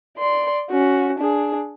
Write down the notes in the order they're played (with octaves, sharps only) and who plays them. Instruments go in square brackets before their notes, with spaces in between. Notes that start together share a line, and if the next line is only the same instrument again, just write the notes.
[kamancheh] D5 C6
C#4 F#4
D4 G#4